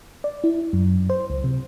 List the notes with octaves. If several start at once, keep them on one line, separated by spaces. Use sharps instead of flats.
D5
E4
F#2
C5
C#2
C3